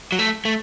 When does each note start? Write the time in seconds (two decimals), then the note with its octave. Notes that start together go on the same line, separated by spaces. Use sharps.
0.12 F#3
0.19 A3
0.45 A3